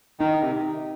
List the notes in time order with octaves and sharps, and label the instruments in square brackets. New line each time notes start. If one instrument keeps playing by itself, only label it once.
[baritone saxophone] D#3 [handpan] D#4
[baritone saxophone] C3